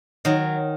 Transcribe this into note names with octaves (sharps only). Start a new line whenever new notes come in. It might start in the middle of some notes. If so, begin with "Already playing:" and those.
D#3 F#3